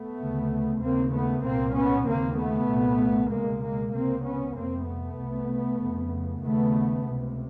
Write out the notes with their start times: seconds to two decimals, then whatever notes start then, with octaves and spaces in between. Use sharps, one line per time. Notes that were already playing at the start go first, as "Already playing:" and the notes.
Already playing: A3 B3
0.18 D2 C#3
0.81 D#2 C#3 A#3 C4
1.12 A3 B3
1.43 C2 A#2 A#3 C4
1.75 B3 C#4
2.06 D#2 C#3 A#3 C4
2.37 A3 B3
2.68 C2 A#2
3.30 C#2 B2 G#3 A#3
3.62 G#3 A#3
3.93 C#2 C3 A#3 C4
4.24 B3 C#4
4.56 F2 C3 A#3 C4
4.87 A3 B3
5.18 C2 C3
5.81 F2 C#3
6.43 D#2 C#3 A3 B3
7.05 C#2 C3